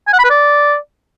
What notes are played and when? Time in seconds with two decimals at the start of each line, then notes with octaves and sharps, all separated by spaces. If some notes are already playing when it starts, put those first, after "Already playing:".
0.08 G#5
0.13 F#5
0.19 B5
0.25 B4
0.30 D5